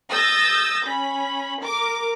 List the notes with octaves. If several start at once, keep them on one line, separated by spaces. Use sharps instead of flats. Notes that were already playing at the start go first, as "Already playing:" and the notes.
D#6 E6 G6 A6 A#6
C#4 B5
A#4 D6